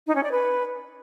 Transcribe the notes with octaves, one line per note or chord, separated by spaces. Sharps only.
D#4
C#4
D5
B4